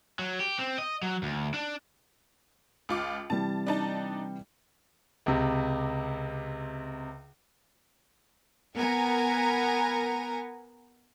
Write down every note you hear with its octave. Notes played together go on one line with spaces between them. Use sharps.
F#3
G4
C4
D#5
F#3
D2
D4
C#2 F4 D6
C3 E3 G3 A5
D4 D#4 A5
C#2 C3
B3 A#4 G#5 A#5